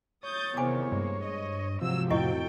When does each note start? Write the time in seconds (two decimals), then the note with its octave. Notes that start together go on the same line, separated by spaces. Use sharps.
0.23 C#5 D#6 G6 A6
0.57 E2 C3 D#3 C5 G#5 D6
0.92 G2 G#3 A#3
1.24 D#5
1.81 G#2 C3 F3 F#3 E6
2.10 F2 A2 E4 F#4 A4 D#5 G5 C#6